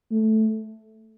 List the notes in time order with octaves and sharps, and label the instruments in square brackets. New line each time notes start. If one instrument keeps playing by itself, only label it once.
[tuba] A3